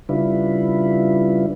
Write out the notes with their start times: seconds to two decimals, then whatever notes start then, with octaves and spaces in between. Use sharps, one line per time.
0.09 C#3 G3 D4 E4 F4 B4